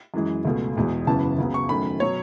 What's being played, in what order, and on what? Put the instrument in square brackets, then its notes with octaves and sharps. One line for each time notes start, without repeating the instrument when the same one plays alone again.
[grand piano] F#2 E3 G#3
C#2 B2 A3
E1 E2 B2 G#3
F#1 F#2 C#3 E3 B3 A5
C#2 C#3 F#3 B3
C#6
F#1 F#2 D#3 A3 B5
B2 F#3 C#5